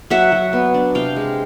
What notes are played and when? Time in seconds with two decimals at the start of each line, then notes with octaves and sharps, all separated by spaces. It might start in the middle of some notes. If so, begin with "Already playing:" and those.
0.10 F#3 E5 F#5
0.32 F#3
0.53 B3
0.74 D4
0.95 C3 F5 G5
1.16 G#3